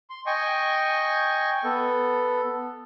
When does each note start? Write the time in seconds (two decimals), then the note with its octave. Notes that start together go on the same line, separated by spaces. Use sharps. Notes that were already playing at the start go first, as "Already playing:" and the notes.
0.10 C6
0.26 D#5 G5 G#5 C#6
1.64 B3 A4